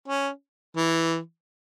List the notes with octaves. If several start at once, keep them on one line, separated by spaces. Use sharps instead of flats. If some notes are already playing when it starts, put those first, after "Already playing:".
C#4
E3